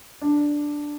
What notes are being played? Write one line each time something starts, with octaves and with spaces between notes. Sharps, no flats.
D4